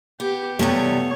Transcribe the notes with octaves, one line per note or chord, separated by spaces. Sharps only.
B3 G4
E2 C3 G3 A3 B3 C#5